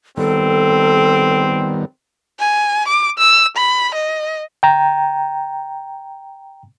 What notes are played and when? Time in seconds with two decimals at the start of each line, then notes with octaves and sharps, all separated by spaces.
0.17 D#3 G3 B3 C4 A4
2.39 G#5
2.87 D6
3.18 E6
3.57 B5
3.94 D#5
4.63 G5 A#5